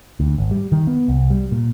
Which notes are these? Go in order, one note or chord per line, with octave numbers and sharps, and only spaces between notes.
D2
G#1
G3
D#3
B3
C2
G3
A#2